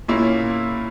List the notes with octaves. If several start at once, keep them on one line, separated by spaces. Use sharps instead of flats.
A#2 A#3 C#4 E4